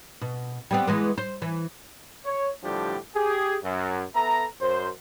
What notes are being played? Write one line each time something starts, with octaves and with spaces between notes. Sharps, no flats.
B2
G3 B3 C4
E3 G#3 B3
C5
E3
C#5
A2 D3 F3 G3 D4 G4
G4 G#4
F#2
B3 A4 E5 A#5
F#2 C5